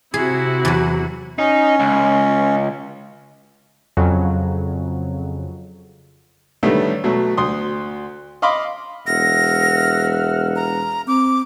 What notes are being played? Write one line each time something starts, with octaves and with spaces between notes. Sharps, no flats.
C3 E4 F#4 G#4
E2 F#3
C#4 D#4
C#2
F2 C#3 F#3
A2 D3 D#3 G3 A3 B3
B2 F#3 A3
D2 C6 D#6
D#5 F5 B5 C6 D6
E1 E5 F#5 F6 A#6
A#5
C4 D6